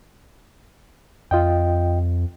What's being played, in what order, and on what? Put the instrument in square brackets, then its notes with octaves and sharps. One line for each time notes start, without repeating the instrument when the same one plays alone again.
[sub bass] F2 [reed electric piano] F4 D#5 G5